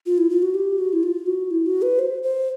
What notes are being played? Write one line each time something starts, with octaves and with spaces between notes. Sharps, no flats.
F4
E4
F4
F#4
G4
F#4
E4
F4
F#4
E4
F#4
B4
C5
C5